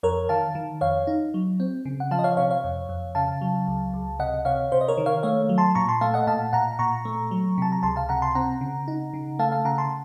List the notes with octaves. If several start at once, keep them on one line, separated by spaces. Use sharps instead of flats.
F2 A#4 C#5
D#3 F5 A5
D#3
F2 C#5 F5
D#4
F#3
C4
C#3
F#5
F3 F5 A5
D#5
C#5 F5
C3 C#5 F5
C#5 F5
F2
F2
C#3 F5 A5
F#3
C#2
C#2
C3 D#5 F#5
C3 C#5 F5
C3 C5
D#5
A#4 C#5
D#3
C#5 F5
A3 C#5 F5
F#3
A5 C6
A#2 A#5 C#6
A5 C6
A3 F5 A5
D#5 F#5
A#2 F5 A5
A#2 F#5 A#5
A#2 A#5 C#6
A3
F#3
C3 A5
A#5
C#2 A5 C6
F5 A5
C3 F#5 A#5
A5 C6
C4 F#5 A#5
C#3
D#4
C#3
A3 F5 A5
F5 A5
C#3 F#5 A#5
A5 C6